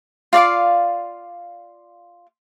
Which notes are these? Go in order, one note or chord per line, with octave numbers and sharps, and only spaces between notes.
F4 D5 F5 D6